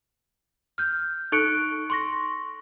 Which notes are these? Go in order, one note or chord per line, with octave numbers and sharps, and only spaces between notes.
F6 G6
D#4 A4 C#6 F#6 C#7 D7
C6 C#6 A#6